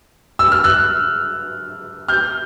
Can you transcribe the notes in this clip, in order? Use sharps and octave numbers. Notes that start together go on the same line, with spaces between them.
E6
F6
E6 F#6
F6 G6